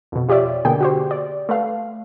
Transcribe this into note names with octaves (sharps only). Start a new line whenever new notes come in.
F2 B2
F4 G4 C#5 D5 E5
B2 D3 A#3 G#4 G5
F#4 G4 C5
D5
A3 B4 F5